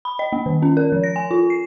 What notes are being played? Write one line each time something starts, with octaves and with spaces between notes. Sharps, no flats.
B5
D#5
A#3
D#3
C#4
A#4
F3
A#6
G#5
F4
C7